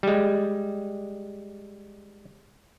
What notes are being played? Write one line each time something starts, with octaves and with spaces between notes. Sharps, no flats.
G3 G#3